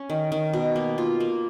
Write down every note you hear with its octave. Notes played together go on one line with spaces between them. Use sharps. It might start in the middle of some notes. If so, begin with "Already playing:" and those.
Already playing: C#4
D#3
D#3
B2
A#3
F4
A#3